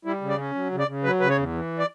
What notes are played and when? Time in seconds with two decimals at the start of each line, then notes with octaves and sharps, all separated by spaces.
0.05 G3 E4
0.21 C#3
0.29 D5
0.38 C#4
0.55 F#3
0.71 C#3
0.79 D5
0.88 C#3
1.04 F#3 B4
1.20 C#3 B4
1.30 C#5
1.37 E2
1.54 E3
1.79 D5